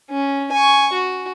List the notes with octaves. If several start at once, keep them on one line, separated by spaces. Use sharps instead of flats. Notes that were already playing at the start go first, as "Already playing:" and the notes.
C#4
G#5 C#6
F#4